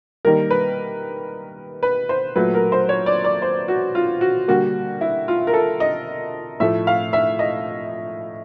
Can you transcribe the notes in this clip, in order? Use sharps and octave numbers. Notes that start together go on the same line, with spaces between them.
D#3 G3 A#3 A#4
B4
B4
C5
A#2 F#3 A3 B4
A#4
C5
C#5
D5
D5
C5
F#4
F4
F#4
D3 G3 A#3 F#4
E4
F4
A#4
A4
D#5
A2 F3 A3 E5
F5
E5
D#5